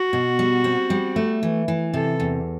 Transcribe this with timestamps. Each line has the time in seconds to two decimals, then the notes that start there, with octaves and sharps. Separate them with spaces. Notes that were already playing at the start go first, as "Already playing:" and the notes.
Already playing: F#4
0.13 B2
0.39 G3
0.64 C4
0.90 G3
1.16 A3
1.43 E3
1.68 E3
1.93 C3 A4
2.20 E2